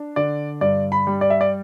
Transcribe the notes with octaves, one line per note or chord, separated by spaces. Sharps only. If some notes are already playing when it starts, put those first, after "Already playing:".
Already playing: D4
D3 D5
G2 D5
B5
G3
D5
E5
D5